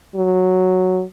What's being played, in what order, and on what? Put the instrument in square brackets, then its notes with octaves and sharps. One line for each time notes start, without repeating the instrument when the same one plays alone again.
[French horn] F#3